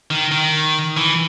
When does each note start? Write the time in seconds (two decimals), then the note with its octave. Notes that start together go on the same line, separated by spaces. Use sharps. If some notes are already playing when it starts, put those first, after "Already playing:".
0.11 D#3
0.31 D#3
0.97 E3